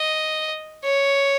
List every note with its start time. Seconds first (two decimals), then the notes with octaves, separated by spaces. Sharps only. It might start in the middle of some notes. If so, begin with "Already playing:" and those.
Already playing: D#5
0.84 C#5